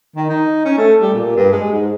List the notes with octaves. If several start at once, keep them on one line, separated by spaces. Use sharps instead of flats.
D#3
D#4
C#4
A3
G3
A#2
G2
G#3
G#2